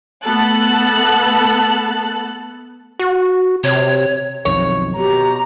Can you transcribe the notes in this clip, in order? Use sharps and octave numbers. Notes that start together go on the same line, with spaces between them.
A3 B3 A4 A5 F#6
F#4
C3 C#5
B1 F2 D#3 C#5
B2 G4 A#5